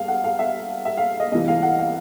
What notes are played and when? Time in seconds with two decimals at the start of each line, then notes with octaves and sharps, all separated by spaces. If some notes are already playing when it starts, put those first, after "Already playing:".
Already playing: G2 F5
0.08 F#5
0.24 F5
0.39 E5
0.85 E5
0.97 F5
1.20 D#5
1.32 C2 C3 E3 D#5
1.48 F5
1.62 F#5
1.78 F5